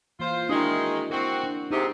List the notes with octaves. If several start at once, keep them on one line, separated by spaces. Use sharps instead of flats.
E3 A#3 F4 C5
D#3 G#3 D4 E4 F#4
C4 E4 F#4 A#4
D4
G#2 C3 D#4